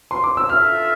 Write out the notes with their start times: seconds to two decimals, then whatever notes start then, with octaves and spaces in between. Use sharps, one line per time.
0.11 C6
0.24 D6
0.37 E6
0.49 F4 A4 E5 F6